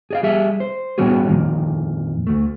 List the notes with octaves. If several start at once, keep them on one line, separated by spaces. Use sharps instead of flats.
G#4 D5 F5
G3 G#4 E5
C5
A#2 G3 B3 C#4 F#4 G#4
F2 A#2 D#3
D2 A3